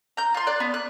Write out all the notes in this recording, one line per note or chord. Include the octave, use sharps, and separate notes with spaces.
A#5 G6
F4 C6
D5 F#6
B3
F#6